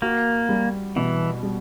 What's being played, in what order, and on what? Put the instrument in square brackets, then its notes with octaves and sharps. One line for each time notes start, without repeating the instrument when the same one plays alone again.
[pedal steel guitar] A#3 [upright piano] F#4
[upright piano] G3
[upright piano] B2 [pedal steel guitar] E3
[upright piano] G3